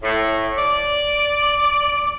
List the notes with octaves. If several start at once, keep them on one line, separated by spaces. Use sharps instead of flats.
A2
D5